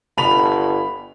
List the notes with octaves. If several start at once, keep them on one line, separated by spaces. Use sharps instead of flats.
G1 B5 F7